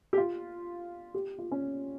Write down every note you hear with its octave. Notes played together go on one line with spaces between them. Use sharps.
G4
F4
G4
F4
C#4